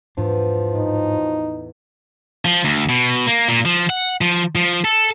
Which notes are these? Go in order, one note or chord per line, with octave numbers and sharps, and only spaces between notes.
E2 G#2 F3 D4
A2 D#4
F3
D2
B2
A#3
A#2
F3
F#5
F3
F3
A4